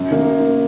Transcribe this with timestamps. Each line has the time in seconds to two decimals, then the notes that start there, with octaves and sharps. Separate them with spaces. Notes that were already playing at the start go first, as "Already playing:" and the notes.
Already playing: F#2
0.11 D#3 A#3